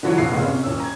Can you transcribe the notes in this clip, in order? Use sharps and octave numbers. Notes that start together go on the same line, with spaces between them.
D3 E3 F#3 F4 C#5
F1 A#1 F#5 C7
G#1 C#2 A#2
C3 C#4
D#1 C#4 E6
A#5 G#6